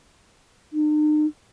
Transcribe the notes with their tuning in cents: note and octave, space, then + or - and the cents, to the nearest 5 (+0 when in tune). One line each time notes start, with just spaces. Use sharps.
D#4 -45